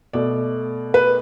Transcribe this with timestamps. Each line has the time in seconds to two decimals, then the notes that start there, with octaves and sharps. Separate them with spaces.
0.13 B2 A3 D5
0.94 B4